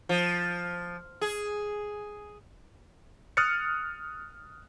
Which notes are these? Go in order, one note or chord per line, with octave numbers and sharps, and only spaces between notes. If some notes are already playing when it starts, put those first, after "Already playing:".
F3
G#4
D#6 F6 F#6 A6 C#7